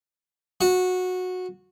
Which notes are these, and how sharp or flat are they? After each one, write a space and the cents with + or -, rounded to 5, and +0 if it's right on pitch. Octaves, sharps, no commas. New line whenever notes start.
F#4 -15